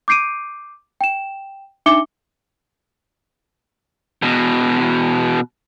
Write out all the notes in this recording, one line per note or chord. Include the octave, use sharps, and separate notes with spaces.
D6 G6 C7 D7 D#7
G5 E7
D4 D#4 E5 D6 C#7 G7
E2 B2